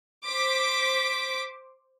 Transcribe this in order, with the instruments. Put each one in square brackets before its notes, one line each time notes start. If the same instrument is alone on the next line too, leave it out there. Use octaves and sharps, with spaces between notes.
[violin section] C5 D6 B6